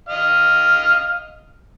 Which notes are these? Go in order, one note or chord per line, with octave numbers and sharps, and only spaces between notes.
D#5 F5